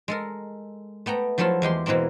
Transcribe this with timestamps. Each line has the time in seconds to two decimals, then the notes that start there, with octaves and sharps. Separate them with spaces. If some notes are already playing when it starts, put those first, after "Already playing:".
0.08 G#3 A4 A#4
1.06 A3 B3 G5 A#5
1.38 F3 F#3 A3 E4 F4
1.62 E2 G#3 G4 C6
1.86 B2 E3 G#3 A#3 C4